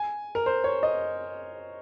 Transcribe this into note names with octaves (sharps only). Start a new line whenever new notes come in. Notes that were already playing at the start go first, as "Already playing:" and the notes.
Already playing: G#5
A#4
C5
C#5
D#5